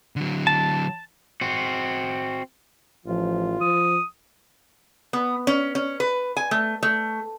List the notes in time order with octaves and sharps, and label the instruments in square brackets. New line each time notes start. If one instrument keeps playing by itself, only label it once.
[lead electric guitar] D3 F#3
[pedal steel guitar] A5
[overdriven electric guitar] C4 F#4
[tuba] A1 [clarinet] F3 [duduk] F4
[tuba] F3 [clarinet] D#6
[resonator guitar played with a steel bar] B3
C#4
C#4
B4
G#5
A3
A3